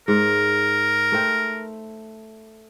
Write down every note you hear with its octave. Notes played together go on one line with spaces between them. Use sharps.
G#2 A#4
A3 C5 G5